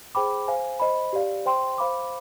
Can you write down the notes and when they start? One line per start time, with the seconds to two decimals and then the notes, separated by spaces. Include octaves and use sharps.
0.15 G#4 C5 G5 B5 D6
0.48 C5 F5 G#5
0.80 C5 D#5 B5
1.13 G4 D5 F5
1.46 C5 G5 C6
1.78 C5 F5 B5 D6